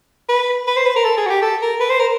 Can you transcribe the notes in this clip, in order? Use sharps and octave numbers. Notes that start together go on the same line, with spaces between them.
B4
B4
C5
B4
A#4
A4
G#4
F#4
G4
A4
A#4
B4
C5
A#4